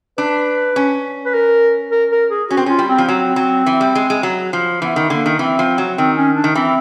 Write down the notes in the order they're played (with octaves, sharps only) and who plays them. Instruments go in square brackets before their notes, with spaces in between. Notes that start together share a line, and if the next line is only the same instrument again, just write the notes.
[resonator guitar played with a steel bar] D4 [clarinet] B4
[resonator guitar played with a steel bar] C#4
[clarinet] B4
A#4
A#4
A#4
G#4
[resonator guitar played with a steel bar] C#4 [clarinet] F#4
[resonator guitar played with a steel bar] C4
[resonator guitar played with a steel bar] C#4 [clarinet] F4
[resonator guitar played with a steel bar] G3
[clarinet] C4
[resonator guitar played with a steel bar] F3
[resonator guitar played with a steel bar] F#3 [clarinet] C4
[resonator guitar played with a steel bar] F#3
E3
G3
G#3
G#3
F#3
F3
[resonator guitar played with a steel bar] E3 [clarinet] B3
[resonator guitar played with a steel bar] D#3
[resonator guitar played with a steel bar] D3 [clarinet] A#3
[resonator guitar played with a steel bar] D#3
[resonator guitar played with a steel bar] E3 [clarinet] C4
[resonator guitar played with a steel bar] F3
F#3
[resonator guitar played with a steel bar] D#3 [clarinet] C4
[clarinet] C#4
D4
[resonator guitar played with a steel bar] D#3
[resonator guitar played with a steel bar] E3 [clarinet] C4